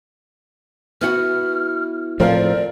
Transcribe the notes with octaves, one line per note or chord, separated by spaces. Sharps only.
B3 E4 F#4 F6
A2 F3 C4 A#4 D5 F5